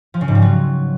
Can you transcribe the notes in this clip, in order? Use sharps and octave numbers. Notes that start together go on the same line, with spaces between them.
F3
C#3
G#2
G3
F#3